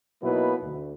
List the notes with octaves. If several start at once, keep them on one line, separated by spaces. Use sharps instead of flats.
B2 F#3 A#3 D#4 E4 B4
D2